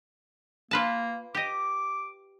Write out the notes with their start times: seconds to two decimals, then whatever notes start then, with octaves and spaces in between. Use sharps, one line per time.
0.71 A#3 F4 B4 A5
1.35 G4 D#5 D6